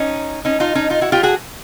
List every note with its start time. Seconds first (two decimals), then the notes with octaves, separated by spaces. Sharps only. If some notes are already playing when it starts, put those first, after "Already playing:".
Already playing: C#4 D#4
0.45 C#4 D#4
0.60 D#4 F4
0.75 C#4 D#4
0.90 D#4 F4
1.01 E4 F#4
1.12 F4 G4
1.23 F#4 G#4